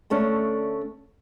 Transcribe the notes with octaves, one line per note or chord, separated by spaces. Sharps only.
D2 A3 C#4 D4